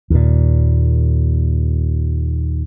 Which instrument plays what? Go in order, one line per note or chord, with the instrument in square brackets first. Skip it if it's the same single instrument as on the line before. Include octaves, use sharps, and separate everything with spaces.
[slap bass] D#2 A#2